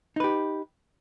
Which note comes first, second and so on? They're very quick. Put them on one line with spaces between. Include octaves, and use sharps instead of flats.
D#4 B4 G4